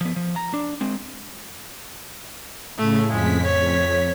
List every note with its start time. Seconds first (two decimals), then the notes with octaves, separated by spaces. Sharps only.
0.01 F3 B3
0.16 F3
0.36 A#5
0.54 D4
0.81 G#3 C4
2.78 A2 C#3 A3
3.10 F2 G#3 B6
3.43 C#5